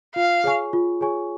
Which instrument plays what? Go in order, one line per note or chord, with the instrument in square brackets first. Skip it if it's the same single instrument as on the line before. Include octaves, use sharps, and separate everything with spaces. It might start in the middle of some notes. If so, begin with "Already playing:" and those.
[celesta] F4 [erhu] F5
[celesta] G#4 C#5 G#5 C#6
F4
G#4 C#5 G#5 C#6